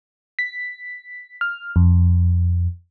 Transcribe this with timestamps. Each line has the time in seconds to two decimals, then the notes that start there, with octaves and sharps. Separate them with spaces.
0.39 B6
1.41 F6
1.76 F2